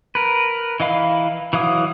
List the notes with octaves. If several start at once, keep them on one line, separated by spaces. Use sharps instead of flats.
A#4 B4
E3 D#5 F5 B5
E3 F#3 F5 D#6